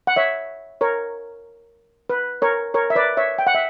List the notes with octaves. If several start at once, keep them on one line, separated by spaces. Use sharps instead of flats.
F#5
C#5 E5
A#4 C#5
B4
A#4 C#5
A#4 C#5
E5
B4 D5
C#5 E5
G5
F#5
E5